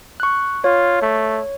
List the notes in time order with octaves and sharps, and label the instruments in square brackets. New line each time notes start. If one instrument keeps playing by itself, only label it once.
[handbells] C#6 F#6
[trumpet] F4 [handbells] C#5
[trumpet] A3